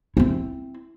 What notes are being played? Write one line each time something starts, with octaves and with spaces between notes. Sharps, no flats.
C4 E4